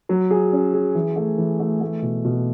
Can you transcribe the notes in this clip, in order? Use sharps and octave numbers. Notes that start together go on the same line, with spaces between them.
F#3
G#4
C#4
G#4
E3
A3
E3
A3
A3
B2
B2